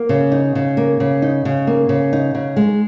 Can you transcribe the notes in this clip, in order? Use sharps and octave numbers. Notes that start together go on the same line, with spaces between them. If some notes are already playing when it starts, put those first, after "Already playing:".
Already playing: A#3
C#3
D#4
C#3
A#3
C#3
D#4
C#3
A#3
C#3
D#4
C#3
G#3